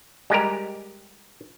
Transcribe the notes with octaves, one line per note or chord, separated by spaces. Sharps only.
G3 G#3 G4 A#4